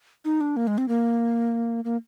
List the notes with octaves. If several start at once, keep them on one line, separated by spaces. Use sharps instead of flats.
D#4
D4
A#3
G#3
C4
A#3
A#3